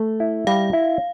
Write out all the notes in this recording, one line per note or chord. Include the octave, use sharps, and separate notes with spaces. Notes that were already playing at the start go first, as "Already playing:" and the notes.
Already playing: A3 E5
E4
G3 F5
E4